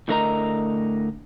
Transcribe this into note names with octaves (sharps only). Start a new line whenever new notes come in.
A2 D3 A3 A#4 D#5 A#5